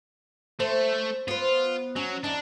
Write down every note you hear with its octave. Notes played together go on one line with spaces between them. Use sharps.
A3 C5
B3 F4 C5
F#3 C#4
E2 D4 D#4